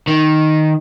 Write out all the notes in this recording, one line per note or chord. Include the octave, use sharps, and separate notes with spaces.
D#3